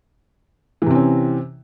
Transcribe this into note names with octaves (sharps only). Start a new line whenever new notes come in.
C3 E3 C4 C#4